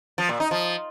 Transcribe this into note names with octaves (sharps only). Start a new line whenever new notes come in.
F3
A#2
D#4
F3